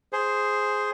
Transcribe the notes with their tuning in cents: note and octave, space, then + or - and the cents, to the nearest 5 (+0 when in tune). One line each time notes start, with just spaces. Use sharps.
G#4 +5 C5 +0